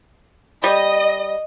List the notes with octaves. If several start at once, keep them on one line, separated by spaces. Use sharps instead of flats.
G3 D#5